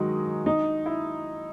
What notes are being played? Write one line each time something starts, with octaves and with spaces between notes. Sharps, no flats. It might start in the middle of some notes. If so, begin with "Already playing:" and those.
Already playing: D#3 F#3 G#3 D#4
D#4
E4